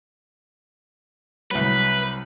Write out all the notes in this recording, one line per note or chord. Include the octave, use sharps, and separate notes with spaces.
C2 F#3 B4